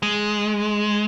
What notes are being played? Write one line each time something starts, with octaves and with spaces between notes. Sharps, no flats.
G#3